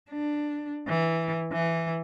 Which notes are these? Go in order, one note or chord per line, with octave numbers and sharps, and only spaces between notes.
D4
E3
E3